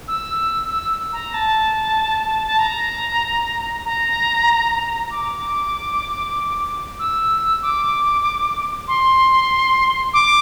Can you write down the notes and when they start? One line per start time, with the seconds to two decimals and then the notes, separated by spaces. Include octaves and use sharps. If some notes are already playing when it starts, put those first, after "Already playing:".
0.08 E6
0.71 E6
1.13 A#5
1.34 A5
2.47 A5
2.59 A#5
3.85 A#5
5.11 D6
6.99 E6
7.62 D6
8.88 C6
10.14 D6